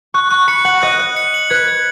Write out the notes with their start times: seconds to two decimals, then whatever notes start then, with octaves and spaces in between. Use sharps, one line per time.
0.14 C#6 F#6
0.30 C#6 F#6
0.48 B5 C#7
0.65 F#5 F#7
0.82 D#5 F#6
1.00 F#6
1.16 C#7
1.34 F#7
1.50 B4 G#6
1.68 G#6